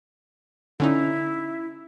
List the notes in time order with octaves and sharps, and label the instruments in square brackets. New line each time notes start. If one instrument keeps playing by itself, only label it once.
[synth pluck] D3 C#4 D#4 [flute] E4